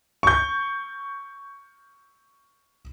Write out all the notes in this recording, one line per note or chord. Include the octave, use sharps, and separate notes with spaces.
C#6 G6